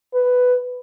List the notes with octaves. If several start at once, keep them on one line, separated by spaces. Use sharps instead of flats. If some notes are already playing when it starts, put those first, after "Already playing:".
B4